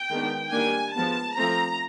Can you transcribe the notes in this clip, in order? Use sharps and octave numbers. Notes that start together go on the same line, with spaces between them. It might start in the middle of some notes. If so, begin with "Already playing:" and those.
Already playing: G5
D#3 G#3 B3 D4
D#3 G3 A#3 D4 G#5
F3 G#3 B3 A5
F3 A3 C4 A#5